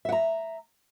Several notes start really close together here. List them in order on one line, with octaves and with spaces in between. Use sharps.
E5 F#5 A#5